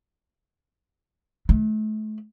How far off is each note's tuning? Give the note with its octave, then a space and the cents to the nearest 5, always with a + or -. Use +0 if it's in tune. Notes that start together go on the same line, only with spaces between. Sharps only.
A3 -35